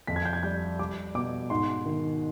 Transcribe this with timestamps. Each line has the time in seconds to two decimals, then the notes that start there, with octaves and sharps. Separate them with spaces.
0.07 F2 B6
0.16 G#6
0.25 G6
0.33 G#6
0.43 G3 G6
0.79 G3 D6
1.15 B2 D6
1.50 G#2 C6
1.86 D#3